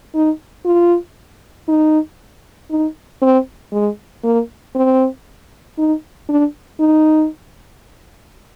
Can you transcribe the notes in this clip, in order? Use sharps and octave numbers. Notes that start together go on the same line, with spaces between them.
D#4
F4
D#4
D#4
C4
G#3
A#3
C4
D#4
D4
D#4